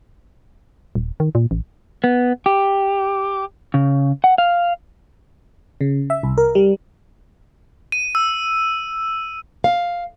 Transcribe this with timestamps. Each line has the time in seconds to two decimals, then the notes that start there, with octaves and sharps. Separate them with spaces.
0.95 D#1
1.20 D#3
1.35 A#2
1.51 A1
2.04 B3
2.46 G4
3.74 C#3
4.24 F#5
4.38 F5
5.81 C#3
6.10 E5
6.23 C2
6.38 A#4
6.55 G3
7.92 D#7
8.15 E6
9.64 F5